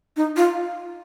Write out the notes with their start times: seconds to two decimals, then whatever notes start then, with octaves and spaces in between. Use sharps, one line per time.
0.16 D#4
0.36 F4